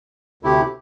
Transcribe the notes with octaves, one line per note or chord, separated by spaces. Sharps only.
D2 C3 A3 E4 G4